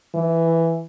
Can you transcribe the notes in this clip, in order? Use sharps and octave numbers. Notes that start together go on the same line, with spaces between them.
E3